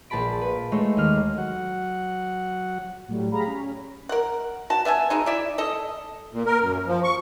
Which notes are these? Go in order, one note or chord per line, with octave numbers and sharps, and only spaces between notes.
A#1 G#4 A5 B5 D7
B4
G#3 A3 D#4 C#5 E6
D#2 F6
F#3 F#5
A2 F#3 G3
G4 G#4 F5 A#5 B5
C#4
A#4 F#5
F#4 A5
B3 E5 F#5 G#5
F#3 G#3 D#4
E4 D5 E5
A4 D#5
A#2
A#4
F#2
F3
C#6